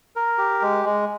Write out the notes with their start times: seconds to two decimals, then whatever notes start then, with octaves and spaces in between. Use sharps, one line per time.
0.16 A#4
0.38 G4
0.62 G#3
0.85 G#3